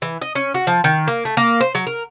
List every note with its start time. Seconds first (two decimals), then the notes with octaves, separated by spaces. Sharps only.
0.02 E3
0.22 D#5
0.35 C#4
0.54 F#4
0.67 F3
0.84 D#3
1.07 A#3
1.25 A3
1.37 A#3
1.61 C5
1.75 F#3
1.87 A#4